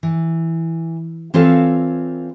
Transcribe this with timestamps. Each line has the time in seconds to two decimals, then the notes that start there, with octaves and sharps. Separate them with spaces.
0.03 E3
1.34 E3 C4 F4 A4 C#5 F5